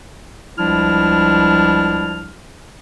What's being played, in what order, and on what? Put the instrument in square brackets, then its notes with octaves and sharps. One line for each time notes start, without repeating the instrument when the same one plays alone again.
[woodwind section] C#2 F3 G3 D4 E4 F6